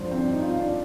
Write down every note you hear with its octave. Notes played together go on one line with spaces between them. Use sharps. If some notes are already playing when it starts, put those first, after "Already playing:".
Already playing: G2 D3 F3 C5
C4
D4
D#4
F4
D4